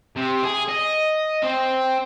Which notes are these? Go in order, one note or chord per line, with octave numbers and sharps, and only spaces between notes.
C3
G#4
D#5
C4